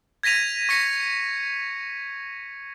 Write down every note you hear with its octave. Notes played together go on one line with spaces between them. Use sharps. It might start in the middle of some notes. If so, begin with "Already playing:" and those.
G#6 A#6 B6 D#7 F7
C#6 A#6 B6 C#7